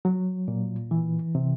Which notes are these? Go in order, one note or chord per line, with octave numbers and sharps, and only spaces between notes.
F#3
A#2
E3
C3